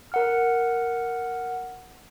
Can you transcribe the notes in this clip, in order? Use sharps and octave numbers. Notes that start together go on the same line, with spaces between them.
A#4 F#5 F6